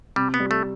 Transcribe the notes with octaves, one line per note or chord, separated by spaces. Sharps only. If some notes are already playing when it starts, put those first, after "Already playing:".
C3 G3
B3
G3
A3